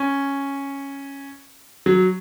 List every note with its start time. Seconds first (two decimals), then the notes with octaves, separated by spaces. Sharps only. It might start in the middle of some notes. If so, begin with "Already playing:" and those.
Already playing: C#4
1.86 F#3